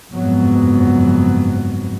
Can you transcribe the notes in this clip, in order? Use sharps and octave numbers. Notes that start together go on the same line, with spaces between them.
F#1 F2 G#2 F#3 B3